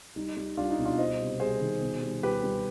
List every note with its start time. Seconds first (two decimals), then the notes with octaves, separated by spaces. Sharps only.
0.16 G3 D#4
0.37 G3
0.57 G3 D4 F4
0.71 D#4
0.78 B2
0.85 D4 F4
0.98 G3 C5 D#5
1.20 C3
1.40 G3 G#4 C5
1.61 D#3
1.81 B2
2.03 G3
2.23 G3 G4 B4
2.43 G3